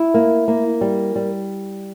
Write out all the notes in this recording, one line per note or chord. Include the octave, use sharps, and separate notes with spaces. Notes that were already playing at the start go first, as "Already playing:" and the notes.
Already playing: E4
A#3
A#3
G3
G3